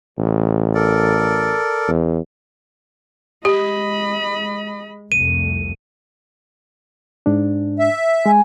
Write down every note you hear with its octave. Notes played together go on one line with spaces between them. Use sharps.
A1
A4 A#4 D5
E2
G#3 G4 D#5 B5
C2 F2 A3 D#7
G#2 D4
E5
G#3 G#5